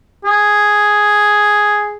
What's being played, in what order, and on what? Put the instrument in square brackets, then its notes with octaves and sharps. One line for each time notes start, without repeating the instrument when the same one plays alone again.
[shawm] G#4